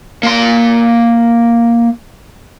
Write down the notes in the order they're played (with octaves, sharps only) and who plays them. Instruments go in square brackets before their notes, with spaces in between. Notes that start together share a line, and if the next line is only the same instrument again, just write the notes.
[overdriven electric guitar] A#3 C6